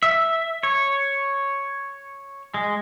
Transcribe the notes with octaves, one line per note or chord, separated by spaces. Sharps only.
E5
C#5
G#3